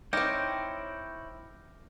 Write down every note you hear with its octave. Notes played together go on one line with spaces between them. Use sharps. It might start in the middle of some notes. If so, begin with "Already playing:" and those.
C4 D#4 E4 C#5 G5 D6 F6 A#6